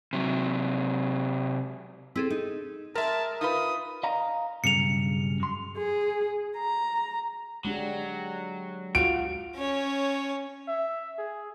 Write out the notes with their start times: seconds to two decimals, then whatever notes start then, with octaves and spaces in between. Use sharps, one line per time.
0.13 C3 F#3
2.16 C4 E4 G#4 A4
2.30 D#4
2.95 G#3 A#4 E5 A5
3.41 D#4 F4 B4 D#6
4.03 D#5 F5 A#5
4.64 B1 G2 C#3 C#7 F7
5.40 F#2 C6
5.77 G#4
6.58 A#5
7.65 F#3 G#3 D4 G4
8.95 F4 F#4 D7
9.56 C#4 C#5
10.68 E5
11.18 G#4